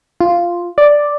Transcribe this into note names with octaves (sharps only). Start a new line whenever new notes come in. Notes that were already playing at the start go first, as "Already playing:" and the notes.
F4
D5